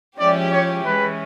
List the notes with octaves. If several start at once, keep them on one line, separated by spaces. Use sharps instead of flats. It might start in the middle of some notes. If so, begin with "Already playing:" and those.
F3 G#3 C#4 E4 G4 D5
C#5
E3 G#3 C#4 B4